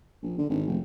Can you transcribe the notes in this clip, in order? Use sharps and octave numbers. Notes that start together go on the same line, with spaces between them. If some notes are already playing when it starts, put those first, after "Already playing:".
A#1
D3
G#1
F1